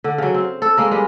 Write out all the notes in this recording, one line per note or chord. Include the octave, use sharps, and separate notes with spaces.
D3
C#3 F#3
C4
A4
G#3 A#3 A#4
G3 G#3